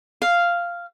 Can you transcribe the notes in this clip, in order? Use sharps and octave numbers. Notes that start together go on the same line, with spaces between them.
F5